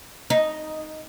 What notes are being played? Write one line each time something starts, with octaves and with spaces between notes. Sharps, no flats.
D#4